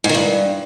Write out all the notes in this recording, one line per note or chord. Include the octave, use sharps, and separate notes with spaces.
G#2
D#3
G2